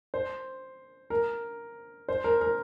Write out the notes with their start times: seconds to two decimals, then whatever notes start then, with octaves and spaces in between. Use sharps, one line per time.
0.14 C5
1.10 A#4
2.09 C5
2.24 A#4
2.41 A#4